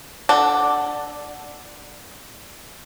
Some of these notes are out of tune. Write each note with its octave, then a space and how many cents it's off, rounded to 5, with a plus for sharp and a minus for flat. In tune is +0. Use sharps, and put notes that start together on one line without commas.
D4 +0 A4 +0 F#5 +0